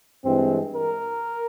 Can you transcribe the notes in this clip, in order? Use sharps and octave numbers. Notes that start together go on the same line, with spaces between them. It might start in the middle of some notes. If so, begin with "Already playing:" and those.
G2 E3 G#3 C4
A#4